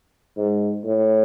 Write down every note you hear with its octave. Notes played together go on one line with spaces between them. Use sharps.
G#2
A2